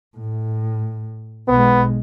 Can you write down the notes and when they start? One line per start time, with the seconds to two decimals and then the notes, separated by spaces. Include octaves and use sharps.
0.17 A2
1.48 B1 G#3 B3